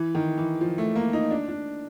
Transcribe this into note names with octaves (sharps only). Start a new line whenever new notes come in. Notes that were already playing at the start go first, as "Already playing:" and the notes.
Already playing: E3
D#3
E3
F3
A3
A#3
D#4
D4
D4